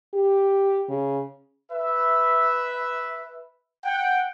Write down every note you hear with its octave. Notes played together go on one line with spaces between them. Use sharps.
G4
C#3
B4 E5
F#5 G5